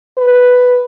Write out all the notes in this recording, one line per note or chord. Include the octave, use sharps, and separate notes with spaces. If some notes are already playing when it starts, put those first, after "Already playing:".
B4